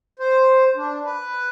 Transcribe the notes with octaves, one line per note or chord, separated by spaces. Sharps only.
C5
D4
B4